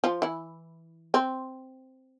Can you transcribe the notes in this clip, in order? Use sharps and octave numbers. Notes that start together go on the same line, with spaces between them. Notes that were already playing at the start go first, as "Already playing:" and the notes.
F3 F4
E3 E4
C4